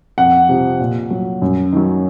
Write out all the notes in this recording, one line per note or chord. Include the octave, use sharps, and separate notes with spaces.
F2 F#5
C3 F3
A#2
F#3
F#2
D#3 F#3